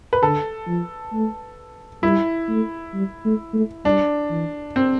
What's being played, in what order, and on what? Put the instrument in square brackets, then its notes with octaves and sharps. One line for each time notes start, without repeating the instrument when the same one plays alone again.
[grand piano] B4
[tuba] D3 [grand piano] A4
[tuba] F3
A3
[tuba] G3 [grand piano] E4
[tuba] A3
G3
A3
A3
[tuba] G3 [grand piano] D4
[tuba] E3
[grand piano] C4